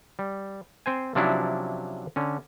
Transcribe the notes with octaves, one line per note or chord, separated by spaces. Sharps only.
G3
C4 C5 G#5
C3 F3 F#3 C#4 D4 E4
D3 C#4